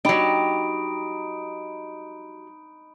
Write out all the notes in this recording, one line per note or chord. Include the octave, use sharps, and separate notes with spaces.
F#3 D#4 G4 B5 D7